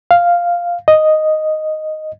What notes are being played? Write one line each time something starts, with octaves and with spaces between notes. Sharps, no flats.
F5
D#5